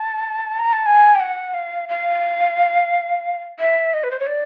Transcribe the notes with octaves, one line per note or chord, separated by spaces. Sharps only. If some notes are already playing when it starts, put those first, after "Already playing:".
Already playing: A5
A#5
A5
G#5
G5
F#5
F5
F5
E5
D#5
B4
C5
C#5
D5